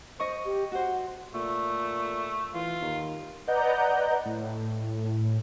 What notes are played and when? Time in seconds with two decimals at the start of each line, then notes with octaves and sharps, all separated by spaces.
0.20 C5 D#5 C#6
0.45 G4
0.71 F#4 C5 F#5
1.34 A#2 A3
2.54 E3 F4
2.81 D#2
3.48 B4 D5 D#5 F#5 A#5 G6
4.25 A2